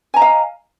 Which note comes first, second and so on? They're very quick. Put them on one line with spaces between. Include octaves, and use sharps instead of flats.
G#5 A#5 D#5 F5